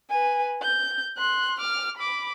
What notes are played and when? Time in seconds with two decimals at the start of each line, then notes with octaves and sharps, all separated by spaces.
0.10 B4 G#5
0.62 G6
1.17 C6 F#6
1.60 D6 F6
1.97 B5 D6